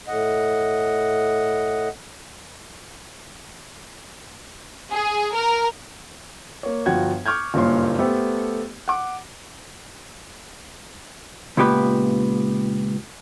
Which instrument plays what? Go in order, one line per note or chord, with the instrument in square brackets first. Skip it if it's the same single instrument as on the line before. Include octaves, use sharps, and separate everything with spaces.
[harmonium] A2 D#5 F#5
[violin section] G#4
A#4
[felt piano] A#3 C#5
G1 F3 F#4 F#5 G5 G#6
C#6 D6 F6 G6 G#6
F#1 G2 A#2 C#5 C6
A3 B3 G4 A4 C5
F#5 D6
[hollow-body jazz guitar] C#2 A#2 B3 G4 B4